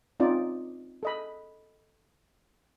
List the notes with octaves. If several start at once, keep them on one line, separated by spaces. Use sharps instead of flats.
C4 C#4 D#4 F4 D5
A4 D#5 B5